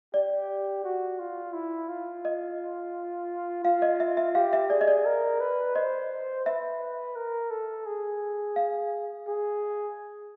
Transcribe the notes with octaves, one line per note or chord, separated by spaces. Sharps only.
G4 D5
F#4
F4
E4
F4
D#5
F4 F5
D#5
E5
E5
G4 F5
E5
G#4 D5
D#5
D5
A#4
B4
C5 D#5
B4 E5
A#4
A4
G#4
F5
G#4